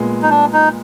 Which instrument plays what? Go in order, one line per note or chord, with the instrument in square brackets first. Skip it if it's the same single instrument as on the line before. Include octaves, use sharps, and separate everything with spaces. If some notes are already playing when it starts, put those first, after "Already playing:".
Already playing: [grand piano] A#2 G#3 B3
[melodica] D#4
D4
D#4